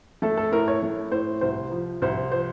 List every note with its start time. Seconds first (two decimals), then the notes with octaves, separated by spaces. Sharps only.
0.22 A3 A4
0.37 A4
0.52 A2 A#4
0.68 C#5
0.82 A3
1.12 A2 C5
1.41 C2 C5
1.71 F3
2.02 C2 C5
2.32 F3 C5